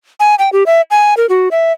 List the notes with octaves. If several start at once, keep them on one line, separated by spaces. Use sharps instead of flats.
G#5
G5
G4
E5
G#5
A#4
F#4
E5